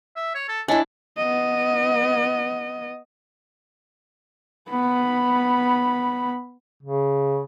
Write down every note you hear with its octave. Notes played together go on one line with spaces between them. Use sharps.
E5
C#5
A4
D4 E4 A4 C#5 D#5 G#5
B3 D#5
B3 B5
C#3